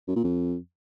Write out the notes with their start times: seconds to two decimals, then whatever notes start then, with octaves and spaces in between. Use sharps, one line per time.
0.08 F#2
0.16 A#2
0.24 F2